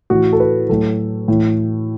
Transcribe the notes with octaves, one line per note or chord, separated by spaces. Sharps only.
A2 E3 F#4
A4
B4
A2 F#3 A4
A2 E3